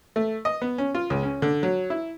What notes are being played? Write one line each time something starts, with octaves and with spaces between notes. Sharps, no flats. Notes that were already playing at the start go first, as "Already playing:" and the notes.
A3
D#5
B3
C#4
F4
C#2
C#4
D3
F#3
E4